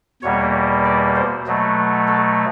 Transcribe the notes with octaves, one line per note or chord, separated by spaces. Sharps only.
E2 B2 G3 A#3 C#5
D5
C5
B2 F#3 A3
A4